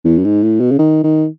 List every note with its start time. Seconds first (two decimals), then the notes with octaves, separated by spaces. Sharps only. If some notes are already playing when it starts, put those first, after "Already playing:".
0.05 E2
0.19 F#2
0.24 G#2
0.43 A2
0.61 B2
0.72 C#3
0.79 D#3
1.04 D#3